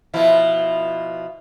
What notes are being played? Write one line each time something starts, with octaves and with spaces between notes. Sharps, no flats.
B2 F3 E4